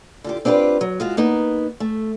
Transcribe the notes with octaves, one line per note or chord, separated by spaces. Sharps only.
D3 F4 G4
C4 D4 F4 G4 B4
F#3
G#3 F4 F#4
A#3 B3 D#4
A3